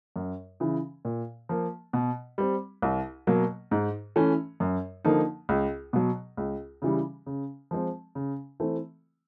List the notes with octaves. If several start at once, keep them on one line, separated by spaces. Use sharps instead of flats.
F#2
C#3 E3
A#2
F3 A#3
B2
G3 C4
C2
B2 F#3 A#3
G#2
E3 A3 C#4
F#2
D3 F3 A#3 D#4
C#2
B2 F#3
C#2
C#3 E3 G3
C#3
F3 G#3 C4
C#3
E3 A3 C4